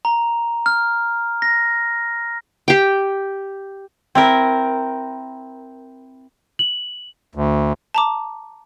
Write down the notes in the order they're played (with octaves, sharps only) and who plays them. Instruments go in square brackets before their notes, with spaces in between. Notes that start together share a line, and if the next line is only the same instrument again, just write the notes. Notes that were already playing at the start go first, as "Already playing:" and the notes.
[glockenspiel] A#5
F6
A#6
[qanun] G4 G5
[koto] C4 E4 A#4
[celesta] F#7
[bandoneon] D2
[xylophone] A5 A#5 D6